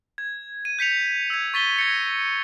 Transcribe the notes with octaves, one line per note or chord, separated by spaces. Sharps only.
G#6
D#7
G6 B6 C#7 F7
E6 G#6
C#6 A6 B6 D#7 G7
G#6 A#6 C#7